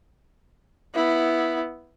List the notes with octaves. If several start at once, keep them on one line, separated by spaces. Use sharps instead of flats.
B3 E4